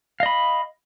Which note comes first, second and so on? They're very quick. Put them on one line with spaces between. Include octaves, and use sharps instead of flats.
F5 D#5 B5